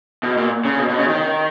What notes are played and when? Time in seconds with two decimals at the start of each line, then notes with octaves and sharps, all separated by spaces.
0.23 B2
0.37 A#2
0.65 C#3
0.79 B2
0.89 B2
0.98 C#3
1.08 D#3